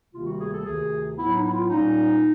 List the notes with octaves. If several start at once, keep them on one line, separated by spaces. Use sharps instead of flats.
D2 C3 D#3 G3 A#3 F4
F#4
G#4
A4
D2 C3 D#3 G#4
A2 F#3 B3 E4
D#4
E4
F4
A#2 G3 A#3 C#4 D#4